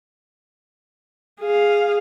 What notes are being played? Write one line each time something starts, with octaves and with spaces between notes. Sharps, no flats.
G#4 F5